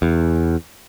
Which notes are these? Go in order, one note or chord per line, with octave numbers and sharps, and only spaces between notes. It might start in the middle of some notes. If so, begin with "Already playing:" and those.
E2